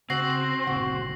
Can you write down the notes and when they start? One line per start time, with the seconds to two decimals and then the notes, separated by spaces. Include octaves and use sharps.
0.10 C#3 C4 F#4 A#6 C7 F#7
0.67 G1 A#2 C#3 F#4